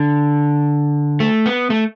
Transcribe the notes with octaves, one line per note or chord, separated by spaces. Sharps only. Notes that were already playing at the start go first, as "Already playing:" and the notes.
Already playing: D3
A3
B3
A3